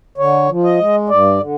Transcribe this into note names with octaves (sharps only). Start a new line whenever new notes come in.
D3 C#5
F3
D#5
G#3
G2 D5
D3